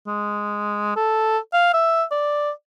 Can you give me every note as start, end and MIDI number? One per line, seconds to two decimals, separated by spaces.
0.07 0.92 56
0.96 1.38 69
1.53 1.73 77
1.74 2.04 76
2.11 2.51 74